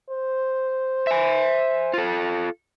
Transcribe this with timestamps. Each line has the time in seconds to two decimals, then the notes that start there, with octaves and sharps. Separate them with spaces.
0.10 C5
1.07 E5 G#5
1.94 F4 A4